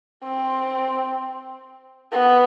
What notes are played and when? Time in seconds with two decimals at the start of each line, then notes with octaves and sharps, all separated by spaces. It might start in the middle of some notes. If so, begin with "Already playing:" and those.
0.24 C4
2.13 B3